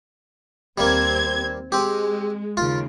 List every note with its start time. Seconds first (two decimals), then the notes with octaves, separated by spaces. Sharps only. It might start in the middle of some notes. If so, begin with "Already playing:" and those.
0.78 D#2 G3 A#3 C4 G#6
1.72 G#3 C4 G4
2.57 D#2 C#3 F4